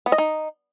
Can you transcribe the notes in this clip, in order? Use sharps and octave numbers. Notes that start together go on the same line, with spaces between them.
B3
D#5
D#4